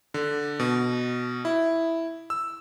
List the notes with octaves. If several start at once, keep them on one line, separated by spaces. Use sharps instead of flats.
D3
B2
E4
E6